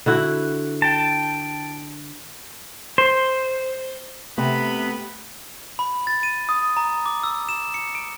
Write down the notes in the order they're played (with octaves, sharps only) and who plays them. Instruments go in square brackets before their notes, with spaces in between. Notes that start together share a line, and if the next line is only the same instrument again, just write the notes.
[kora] D3 E4 F#4
[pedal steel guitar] G5 A5
C5
[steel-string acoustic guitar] C3 [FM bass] A3 [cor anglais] B3 [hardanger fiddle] B5
[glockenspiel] B5
A6
D#7
D#6
A#5
D6
E6
E7
C#7
D7